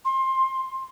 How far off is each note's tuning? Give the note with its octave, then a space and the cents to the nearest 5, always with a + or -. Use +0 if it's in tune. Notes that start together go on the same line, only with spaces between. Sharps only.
C6 +20